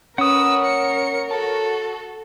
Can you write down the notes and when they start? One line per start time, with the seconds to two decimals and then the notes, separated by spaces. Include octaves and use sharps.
0.18 C#4 A#4 B4 C#5 F#5 D#6 E6
0.65 C#7
1.31 F#4 A4 A5